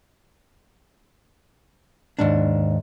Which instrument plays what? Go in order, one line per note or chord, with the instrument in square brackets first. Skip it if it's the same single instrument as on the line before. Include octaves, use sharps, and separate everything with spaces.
[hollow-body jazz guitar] D#2 G#2 D4